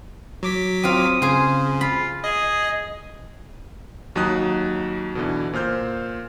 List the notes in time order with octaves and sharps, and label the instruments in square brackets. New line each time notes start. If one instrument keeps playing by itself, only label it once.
[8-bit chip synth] F#3 D6 B6
[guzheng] C4 F4 [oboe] D#6
[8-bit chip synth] C#3 [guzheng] G#4 C5
[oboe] F4 [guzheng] B5
[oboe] G#4 [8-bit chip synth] D#5
[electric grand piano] D#2 F#3 D#4 D#6 F#6
B2 D3 E3
A#2 C5 F6 G6